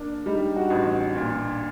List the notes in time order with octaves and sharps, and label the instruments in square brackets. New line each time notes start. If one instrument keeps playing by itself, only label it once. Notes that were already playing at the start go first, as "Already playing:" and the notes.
Already playing: [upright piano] A#3 D4
[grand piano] G3 [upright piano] D#4
[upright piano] F#4
[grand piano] A1
[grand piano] A#2 [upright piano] D4